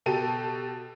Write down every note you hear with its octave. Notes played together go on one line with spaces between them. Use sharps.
B2 G4 A4 D#7